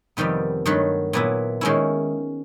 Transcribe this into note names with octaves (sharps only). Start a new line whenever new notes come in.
F2 C3 D#3 G3 B3
G2 D#3 F#3 A3
A#2 F#3 B3 E4
D#3 G#3 C#4 E4